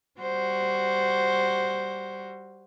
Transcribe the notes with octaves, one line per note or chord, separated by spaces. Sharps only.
G3 F#4 C5